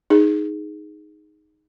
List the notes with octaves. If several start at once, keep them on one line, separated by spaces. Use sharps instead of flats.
D#4 G#4